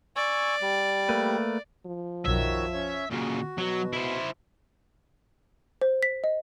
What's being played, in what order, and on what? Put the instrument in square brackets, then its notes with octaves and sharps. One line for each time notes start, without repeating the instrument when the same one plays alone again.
[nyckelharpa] D5 [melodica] G#5 C#6 E6
[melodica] G3
[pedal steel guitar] A3 A#3 B4
[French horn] F3
[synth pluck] B1 F#2 [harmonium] D#3 F#4 C#5 [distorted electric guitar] E5
[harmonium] C#4 C#5
[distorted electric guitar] A#2 C#3 [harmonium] F#4
[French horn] B2 [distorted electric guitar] F#3
[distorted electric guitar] E4 C5
[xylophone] C5
B6
D#5